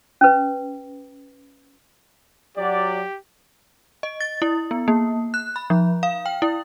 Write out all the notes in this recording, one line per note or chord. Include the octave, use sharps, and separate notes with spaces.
C#4 B4
F#3 G4 D5
D#5
A6
E4
B3
A#3
F#6
B5
F3
F5
G5
E4